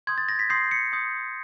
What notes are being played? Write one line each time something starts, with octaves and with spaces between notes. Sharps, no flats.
C6 D#6 G6 G#6
A6
A#6
B6
C6 D#6 G6 C7
C#7
C6 D#6 G6